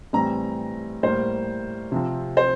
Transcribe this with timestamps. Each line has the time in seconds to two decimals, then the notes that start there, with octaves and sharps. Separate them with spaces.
0.13 A2 E3 G3 C4 A#5
1.03 A2 G3 A#3 C5
1.92 C3 F3 C4
2.37 C5